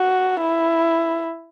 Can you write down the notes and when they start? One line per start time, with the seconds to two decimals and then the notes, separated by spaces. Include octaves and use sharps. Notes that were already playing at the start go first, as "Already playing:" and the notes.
Already playing: F#4
0.41 E4